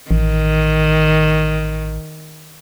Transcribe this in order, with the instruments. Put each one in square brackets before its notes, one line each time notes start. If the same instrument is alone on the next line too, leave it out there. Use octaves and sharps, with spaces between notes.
[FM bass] A1 [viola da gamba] D#3